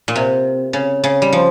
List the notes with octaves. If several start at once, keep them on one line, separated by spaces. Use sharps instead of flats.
A#2
C3
C#3
C#3
G3
F3